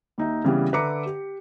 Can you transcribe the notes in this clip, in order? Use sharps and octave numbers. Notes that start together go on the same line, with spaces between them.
D#2 D#4 E5
C#3 E3 G3 B3
D3 B4 E5 A#5 D6 C#7
G4